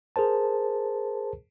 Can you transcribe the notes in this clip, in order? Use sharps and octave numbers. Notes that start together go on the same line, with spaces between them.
G#4 A#4 C5 A5